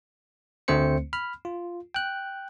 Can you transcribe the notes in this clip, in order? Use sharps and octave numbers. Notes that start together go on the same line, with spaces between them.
D2 D3 A3 C4 C5 C#7
B5 F6
F4
G5 F#6